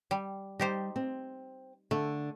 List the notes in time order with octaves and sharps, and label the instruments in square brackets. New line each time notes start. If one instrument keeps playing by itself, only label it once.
[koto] G3
[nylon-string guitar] G3 [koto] D#4 G4 C5
[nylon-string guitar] C4
[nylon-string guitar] D3 [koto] A3